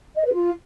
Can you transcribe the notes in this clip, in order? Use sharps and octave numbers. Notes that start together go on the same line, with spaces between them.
D#5
B4
F4